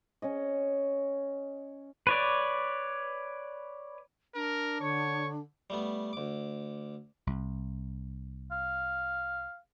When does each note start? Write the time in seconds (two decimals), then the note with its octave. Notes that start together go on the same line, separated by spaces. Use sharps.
0.22 C#4 C#5 D#5
2.07 B4 C#5 D5
4.35 D4 A#4
4.81 D3 C#5 C#6
5.70 G3 A3 B3
6.13 D2 D6
7.27 C2
8.52 F5